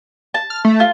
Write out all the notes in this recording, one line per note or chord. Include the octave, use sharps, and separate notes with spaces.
A5
F6
A3
F4